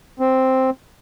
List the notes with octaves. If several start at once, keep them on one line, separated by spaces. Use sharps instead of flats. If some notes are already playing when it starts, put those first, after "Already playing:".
C4